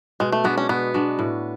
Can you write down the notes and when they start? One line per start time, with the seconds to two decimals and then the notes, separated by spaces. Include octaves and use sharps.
0.20 B2 G#3
0.32 A3
0.44 G#3 B3 D4 F#4
0.58 C#4
0.69 B2 B3
0.94 G#3 D4 F#4
1.19 A2